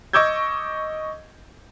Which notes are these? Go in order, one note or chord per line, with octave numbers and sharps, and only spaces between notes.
D#5 C#6 D6 E6 G6 G#6